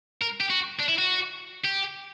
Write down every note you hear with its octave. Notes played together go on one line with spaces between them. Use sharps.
A#4
G4
F#4
D4
E4
F#4
G4